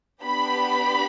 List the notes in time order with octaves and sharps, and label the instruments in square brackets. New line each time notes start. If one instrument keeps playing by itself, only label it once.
[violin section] B3 D4 G4 B5